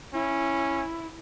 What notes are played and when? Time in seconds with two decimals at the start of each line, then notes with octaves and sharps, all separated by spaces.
0.14 C#4 E4